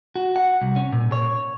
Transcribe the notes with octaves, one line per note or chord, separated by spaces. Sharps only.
F#4
F#5
C2
C#4
A#2
C#5